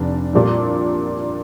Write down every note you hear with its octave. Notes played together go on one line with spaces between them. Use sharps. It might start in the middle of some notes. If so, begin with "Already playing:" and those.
Already playing: F1 D4
A#1 A#2 G3 D4 F4